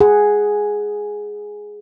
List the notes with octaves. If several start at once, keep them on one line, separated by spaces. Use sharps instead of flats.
G#4 F#5